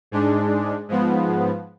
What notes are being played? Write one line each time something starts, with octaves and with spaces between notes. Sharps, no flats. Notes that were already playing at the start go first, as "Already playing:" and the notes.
G#2 G#3 D4
G#2 F3 B3